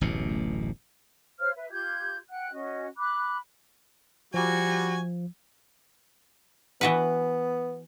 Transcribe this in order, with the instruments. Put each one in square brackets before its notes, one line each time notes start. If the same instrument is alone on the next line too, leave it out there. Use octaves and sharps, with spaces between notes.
[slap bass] D1 A1 F#2 B2
[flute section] C5 C#5 F5 F6
B4 E5
F4 G4 G6 G#6
F#5 G5 F#6
C#4 F#4 D#5
B5 D6 F#6
[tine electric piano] F3 [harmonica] G3 F#4 [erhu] G#5
[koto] E3 F#4 B4 [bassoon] B3